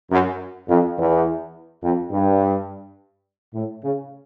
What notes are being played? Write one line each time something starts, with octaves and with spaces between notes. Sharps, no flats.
F#2
F2
E2
F2
G2
A2
C#3